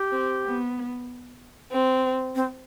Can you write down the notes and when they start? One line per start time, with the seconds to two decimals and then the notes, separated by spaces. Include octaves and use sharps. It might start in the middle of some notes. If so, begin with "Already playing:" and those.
Already playing: G4
0.11 C4
0.44 B3
1.71 C4
2.35 C4